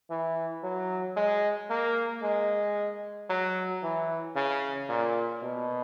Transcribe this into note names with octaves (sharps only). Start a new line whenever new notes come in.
E3
F#3
G#3
A#3
G#3
F#3
E3
C#3
A#2
B2